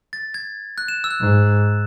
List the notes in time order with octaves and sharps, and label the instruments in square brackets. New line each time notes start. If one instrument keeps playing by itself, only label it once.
[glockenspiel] A6
G#6
F#6
E7
E6
F#6
[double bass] G#2